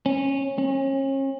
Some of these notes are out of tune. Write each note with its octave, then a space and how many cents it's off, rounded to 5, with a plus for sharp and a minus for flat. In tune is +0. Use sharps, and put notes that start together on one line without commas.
C#4 -20
C#4 -35